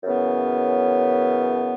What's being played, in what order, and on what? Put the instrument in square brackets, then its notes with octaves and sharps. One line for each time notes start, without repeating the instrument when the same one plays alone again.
[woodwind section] F#2 C#3 E3 B3